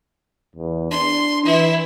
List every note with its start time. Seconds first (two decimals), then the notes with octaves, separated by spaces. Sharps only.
0.55 E2
0.91 D4 C6
1.45 E3 E4